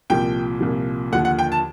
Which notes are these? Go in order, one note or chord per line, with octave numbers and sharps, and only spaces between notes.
C2 A#2 F3 G5
C2 A#2 F3
D#2 D3 F3 F#5
F#5
G5
A5